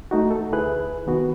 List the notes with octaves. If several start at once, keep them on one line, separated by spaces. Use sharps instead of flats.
A3 D#4 F#4
A4
D2 E4 G#4 B4 F#6
C3 D#3 B3 F#4